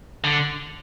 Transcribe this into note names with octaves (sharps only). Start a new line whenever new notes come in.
D3